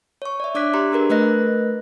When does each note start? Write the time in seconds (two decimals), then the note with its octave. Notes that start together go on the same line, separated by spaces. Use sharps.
0.22 C#5 C#6
0.40 D5 E5
0.55 D4 D5 D6 F#6 B6
0.73 G4 A#5 C6
0.92 D4 G#4 A#4 B4
1.10 A3 A#4 B4 D#5 F#6 A#6